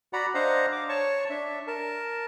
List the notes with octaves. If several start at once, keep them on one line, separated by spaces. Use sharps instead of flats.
F#4 D5 F#5 A#5 B5
D4 C5 D#5 F5 F#5 A#5
D6
C#5 A5 C#6
D4 E5
A#4 A5